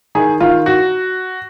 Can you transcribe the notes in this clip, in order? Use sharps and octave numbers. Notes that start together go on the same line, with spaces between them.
D#3 G#4
D#3 F4
F#4